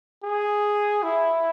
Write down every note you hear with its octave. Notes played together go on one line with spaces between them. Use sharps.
G#4
E4